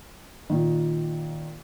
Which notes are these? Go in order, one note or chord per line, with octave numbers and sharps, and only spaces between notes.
A#2 D#3